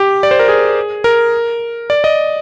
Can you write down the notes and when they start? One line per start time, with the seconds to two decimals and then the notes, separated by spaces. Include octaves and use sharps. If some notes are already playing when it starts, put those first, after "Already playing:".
Already playing: G4
0.23 D5
0.31 C5
0.40 A#4
0.48 G#4
1.04 A#4
1.90 D5
2.04 D#5